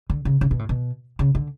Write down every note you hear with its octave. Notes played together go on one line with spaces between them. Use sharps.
D3
C#3
C#3
B2
A2
B2
C#3
D3